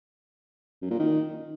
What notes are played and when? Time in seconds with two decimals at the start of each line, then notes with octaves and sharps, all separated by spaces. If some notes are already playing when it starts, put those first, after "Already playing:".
0.82 F#2
0.91 A#2
0.99 D#3